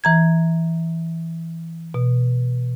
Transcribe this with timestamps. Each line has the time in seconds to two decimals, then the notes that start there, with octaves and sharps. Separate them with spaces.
0.04 E3 A#5 G#6
1.94 B2